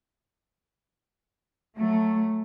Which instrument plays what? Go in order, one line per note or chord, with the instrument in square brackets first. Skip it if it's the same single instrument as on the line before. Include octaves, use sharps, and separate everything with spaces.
[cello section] F#3 A3